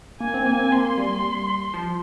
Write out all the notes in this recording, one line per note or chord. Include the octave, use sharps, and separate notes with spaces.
A#3 G#5
C4
A#3
C4
A#3 C6
G3
F3